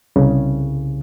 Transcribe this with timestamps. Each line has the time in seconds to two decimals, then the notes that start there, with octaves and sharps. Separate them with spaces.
0.16 C2 C#3